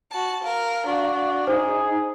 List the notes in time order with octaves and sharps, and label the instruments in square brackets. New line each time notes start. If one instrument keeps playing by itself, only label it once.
[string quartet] F#4 A5
[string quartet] A#4 [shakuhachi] F5
[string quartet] D4 [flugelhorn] F#4
[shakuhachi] D#4 [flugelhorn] G#4 [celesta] C5